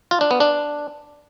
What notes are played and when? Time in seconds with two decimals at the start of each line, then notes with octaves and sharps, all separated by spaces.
0.11 F4
0.21 D4
0.31 B3
0.40 D4